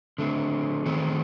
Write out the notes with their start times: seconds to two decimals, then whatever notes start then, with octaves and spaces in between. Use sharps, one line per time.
0.18 D3 A3 C4
0.86 D#3 A3 C4